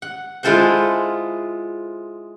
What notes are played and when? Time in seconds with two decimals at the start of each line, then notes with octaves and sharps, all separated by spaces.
0.02 F#5
0.43 G#3 E4 F4 A4 C5 F#5